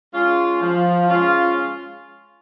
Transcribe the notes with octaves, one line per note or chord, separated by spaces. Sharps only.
G#3 C#4 F4
F3
G#3 C#4 F4